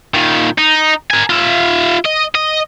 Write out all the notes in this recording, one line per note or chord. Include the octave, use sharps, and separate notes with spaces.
A#2 D#3
D#4
A#4 G#5
F4 E5
D#5
D#5